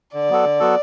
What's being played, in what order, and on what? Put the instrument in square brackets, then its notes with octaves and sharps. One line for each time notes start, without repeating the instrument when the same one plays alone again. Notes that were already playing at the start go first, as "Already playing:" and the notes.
[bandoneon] D3 [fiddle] D5
[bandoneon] F#3 B3 F#4 A4
D3
F#3 B3 F#4 A4